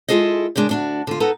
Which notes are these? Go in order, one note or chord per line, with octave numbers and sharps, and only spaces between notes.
G#3 E4 F4 G#4 A4 D#5
F#2 C#3 G#3 D4
D2 D4 F#4
D3 F4
D#4 A4 B4 F#5 A#5